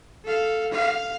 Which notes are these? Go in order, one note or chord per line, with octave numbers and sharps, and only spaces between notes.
A4 F5
F5